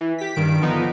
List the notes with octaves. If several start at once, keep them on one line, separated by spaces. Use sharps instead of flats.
E3
G4 B6
G2 D#3 D7
D3 F3 B3 D#4